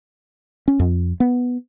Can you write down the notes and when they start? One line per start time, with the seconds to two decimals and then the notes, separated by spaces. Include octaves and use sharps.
0.68 C#4
0.79 F2
1.20 B3